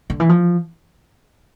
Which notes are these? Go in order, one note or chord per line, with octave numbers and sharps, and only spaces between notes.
D3
E3
F3